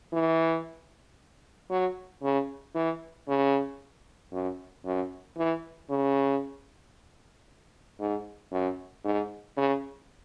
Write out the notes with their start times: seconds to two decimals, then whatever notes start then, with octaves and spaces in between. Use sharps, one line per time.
0.13 E3
1.70 F#3
2.23 C#3
2.75 E3
3.28 C#3
4.32 F#2
4.85 F#2
5.37 E3
5.90 C#3
8.00 G#2
8.52 F#2
9.04 G#2
9.57 C#3